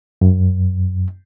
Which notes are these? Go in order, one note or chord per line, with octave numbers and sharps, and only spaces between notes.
F#2